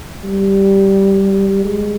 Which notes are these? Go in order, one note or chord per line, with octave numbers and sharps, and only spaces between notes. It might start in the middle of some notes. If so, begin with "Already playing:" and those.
G3
G#3